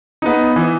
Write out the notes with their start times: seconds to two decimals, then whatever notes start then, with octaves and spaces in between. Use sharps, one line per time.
0.22 B3 D#4
0.56 E3